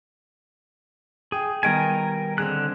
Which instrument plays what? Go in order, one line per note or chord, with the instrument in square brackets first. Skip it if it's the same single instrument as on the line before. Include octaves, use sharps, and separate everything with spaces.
[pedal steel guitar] G#4 [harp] G5
[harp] B2 D#3 G3 [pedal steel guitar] A#4 G5 G#5
[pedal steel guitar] D3 F#6 [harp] C4 G#4